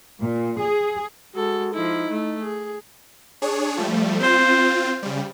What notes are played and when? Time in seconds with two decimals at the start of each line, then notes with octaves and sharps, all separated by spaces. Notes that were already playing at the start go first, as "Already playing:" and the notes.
0.20 A#2
0.59 G#4
1.35 G#3 F#4 A4
1.74 F3 D#4 E4
2.11 A3
2.42 G#4
3.42 D4 G#4 C#5
3.77 F3 G3 A3
4.20 C4 F4 C5
5.02 C#3 G3